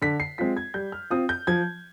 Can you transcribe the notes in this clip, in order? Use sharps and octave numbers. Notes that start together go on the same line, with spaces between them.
D3 B6
C7
G#3 C4 F4 B6
G#6
G3 G6
F6
C4 F4 D#6
G6
F3 G#6